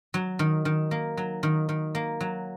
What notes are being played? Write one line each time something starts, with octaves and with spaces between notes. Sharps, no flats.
F#3
D#3
D#3
A#3
F#3
D#3
D#3
A#3
F#3